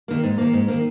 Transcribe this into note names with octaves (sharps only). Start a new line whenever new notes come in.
D#3 A#3
G#2
D#3 A#3
G#2
D#3 A#3